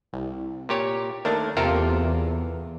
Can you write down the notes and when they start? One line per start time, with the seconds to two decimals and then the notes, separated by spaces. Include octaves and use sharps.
0.13 C2
0.69 A#2 G4 C#5
1.25 D#2 A3 D4 A#4
1.57 E2 C3 A#3 F4 A4 A#4